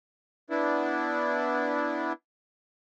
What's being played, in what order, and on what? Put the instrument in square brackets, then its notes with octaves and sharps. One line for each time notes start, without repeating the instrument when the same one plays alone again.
[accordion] B3 D4 E4